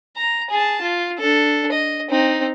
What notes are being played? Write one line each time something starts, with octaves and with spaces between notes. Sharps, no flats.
A#5
G#4 A5
F4
D4 A4
D#5
C4 D#4